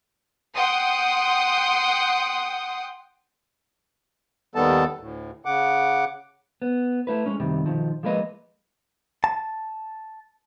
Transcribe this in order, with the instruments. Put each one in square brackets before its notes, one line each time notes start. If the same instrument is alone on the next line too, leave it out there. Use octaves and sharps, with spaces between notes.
[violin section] F#5 G5 C6 D#6
[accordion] D#2 D#3 G3 B3 A4 A5
D2 A2
C#3 F#5 D6
[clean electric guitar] B3
A3 E4 B4
G#3 C#4
F#2 C3 D#3 G3
B1 D#3 F3
F3 G#3 A#3 B4 D#5
A5